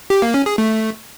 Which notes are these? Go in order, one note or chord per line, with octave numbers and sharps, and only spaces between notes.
G4
A#3
C#4
G#4
A3